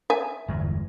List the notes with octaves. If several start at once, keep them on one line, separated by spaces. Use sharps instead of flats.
E5 G#5
G1 E2 G#3